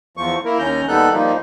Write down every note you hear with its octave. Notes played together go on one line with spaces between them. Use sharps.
E2 F3 C#6
A#3 E4 A#4
D#2 D#3 C#4 A#5 G6
D#2 G3 B3 D#4 A4 F#6
F3 G3 A#3 D#4